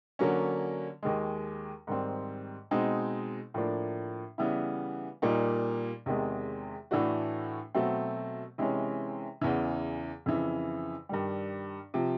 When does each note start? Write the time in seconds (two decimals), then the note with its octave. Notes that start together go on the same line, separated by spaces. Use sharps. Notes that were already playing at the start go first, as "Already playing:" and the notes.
0.19 D3 F#3 A#3 C#4
1.03 D#2 D#3 G#3
1.87 G#2 D#3 G3 C4
2.71 B2 G#3 C4 D#4
3.54 A2 F3 A#3 D4
4.38 C#3 E3 G3 B3 E4
5.22 A#2 G3 A#3 D#4
6.06 E2 C3 D#3 G#3
6.91 A2 E3 A3 D4 F#4
7.75 B2 F#3 A3 C4
8.58 C3 E3 G#3 C#4
9.41 E2 C#3 E3
10.26 F2 C#3 E3
11.09 G2 D#3 G3
11.94 C3 F3